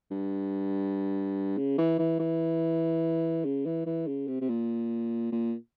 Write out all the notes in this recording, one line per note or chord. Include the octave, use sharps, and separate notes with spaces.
G2
C#3
E3
E3
E3
C#3
E3
E3
C#3
C3
C3
A#2
A#2